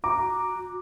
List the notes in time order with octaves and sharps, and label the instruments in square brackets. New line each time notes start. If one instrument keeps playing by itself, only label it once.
[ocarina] F#4 [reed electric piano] A#5 [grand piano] D6